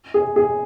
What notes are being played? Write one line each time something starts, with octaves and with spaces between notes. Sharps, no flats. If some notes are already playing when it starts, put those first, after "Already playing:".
G#4
G#4